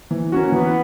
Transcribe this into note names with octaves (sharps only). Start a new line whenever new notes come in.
E3
A#3 C#4 F#4
E3 B3